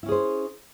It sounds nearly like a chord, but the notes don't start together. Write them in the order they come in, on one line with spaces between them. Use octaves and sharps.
E4 C#4 G#4 C5